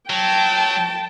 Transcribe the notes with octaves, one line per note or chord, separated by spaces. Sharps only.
F#3 G5 A5